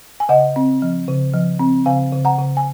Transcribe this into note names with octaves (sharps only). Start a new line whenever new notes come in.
G#5
C#3 D#5 F#5
C4
F3
C#3
F3
C4
C#3 F5 G#5
C#3
F#5 A#5
C#3
G#5